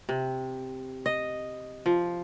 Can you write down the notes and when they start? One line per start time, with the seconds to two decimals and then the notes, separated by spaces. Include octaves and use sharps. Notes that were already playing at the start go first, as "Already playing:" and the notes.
0.09 C3
1.06 D#5
1.86 F3